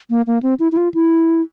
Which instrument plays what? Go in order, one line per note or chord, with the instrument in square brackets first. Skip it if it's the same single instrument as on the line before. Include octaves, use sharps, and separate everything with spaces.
[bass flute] A#3
A#3
C4
E4
E4
F4
E4